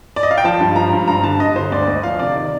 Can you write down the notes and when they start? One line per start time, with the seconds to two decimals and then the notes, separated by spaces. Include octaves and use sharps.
0.16 D5
0.23 D#5
0.31 F5
0.38 G5
0.44 F3 A5
0.60 G2
0.76 F3 A#5
0.93 G2
1.08 G2 A#5
1.24 D3 A5
1.40 G2 D#5
1.56 D3 C5
1.72 D2 D5
1.87 D2 D#5
2.03 F3 F5
2.19 C3 D5
2.35 D#3 D5